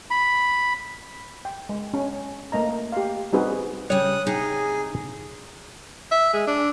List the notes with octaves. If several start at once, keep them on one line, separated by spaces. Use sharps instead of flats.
B5
G5
G#3
C#4
A3 A#3 D#5 A#5
G4 F5
G3 C4 D#4 F#4 G#4 B4
C#3 G3 C#5 D#6 F#6
C3 D#4 G#4 F5
E5
G#3
D4